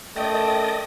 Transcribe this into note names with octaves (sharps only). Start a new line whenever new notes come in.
A3 C#4 A#4 D5 D#5 G5 A5 D#6